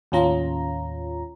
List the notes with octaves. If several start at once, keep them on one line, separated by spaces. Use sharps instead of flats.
D#2 A2 C#4 F4 A#5